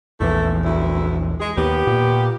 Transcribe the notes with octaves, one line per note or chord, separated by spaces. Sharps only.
A#1 E2 E3 A3 E4
D2 E4
G#3 G#4
D#2 B3 G4
A#2